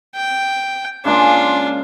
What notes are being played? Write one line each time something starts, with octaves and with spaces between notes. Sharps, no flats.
G5
C#3 G#3 A#3 D4 F4